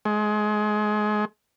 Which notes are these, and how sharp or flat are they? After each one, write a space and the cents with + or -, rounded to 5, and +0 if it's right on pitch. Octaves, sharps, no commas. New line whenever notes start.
G#3 +25